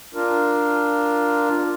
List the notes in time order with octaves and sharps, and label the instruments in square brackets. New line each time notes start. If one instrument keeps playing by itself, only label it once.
[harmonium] D4 F4 A#4